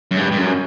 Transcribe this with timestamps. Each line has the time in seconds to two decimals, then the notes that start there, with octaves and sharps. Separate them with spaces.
0.11 F#2
0.17 G2
0.31 G2
0.37 F#2